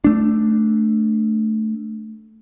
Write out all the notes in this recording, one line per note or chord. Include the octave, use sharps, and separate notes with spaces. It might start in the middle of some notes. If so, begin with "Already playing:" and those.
A3 D4